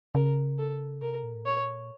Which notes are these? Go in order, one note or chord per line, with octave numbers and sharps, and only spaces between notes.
C#3 A#4
A4
C3 A#4
A#2
A2
A#2 C#5